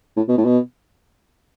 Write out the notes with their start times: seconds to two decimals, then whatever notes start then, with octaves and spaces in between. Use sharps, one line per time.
0.17 A2
0.28 B2
0.38 A2
0.45 B2